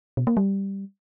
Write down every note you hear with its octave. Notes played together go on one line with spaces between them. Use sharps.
B2
A#3
G3